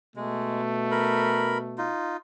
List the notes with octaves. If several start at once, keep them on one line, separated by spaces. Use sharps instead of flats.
B2 G#3 A3
A#4 B5
D#4 F4